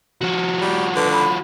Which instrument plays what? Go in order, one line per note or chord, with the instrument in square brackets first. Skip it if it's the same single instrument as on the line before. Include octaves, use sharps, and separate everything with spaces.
[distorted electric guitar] F3 F#4
[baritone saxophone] G3
[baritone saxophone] D3 [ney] B4
[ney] B5